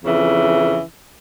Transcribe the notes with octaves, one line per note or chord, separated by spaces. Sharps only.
F2 C#3 E3